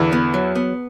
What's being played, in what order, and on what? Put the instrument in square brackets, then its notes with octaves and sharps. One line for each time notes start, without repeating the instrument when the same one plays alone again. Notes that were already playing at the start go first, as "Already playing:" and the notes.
Already playing: [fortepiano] E2 E3 [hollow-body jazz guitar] D3
[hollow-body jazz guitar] B3
F#3
B3